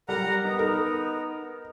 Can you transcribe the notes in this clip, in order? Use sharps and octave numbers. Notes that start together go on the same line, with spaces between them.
G3 A#4 F#5 A#5
B3 D#4
A#4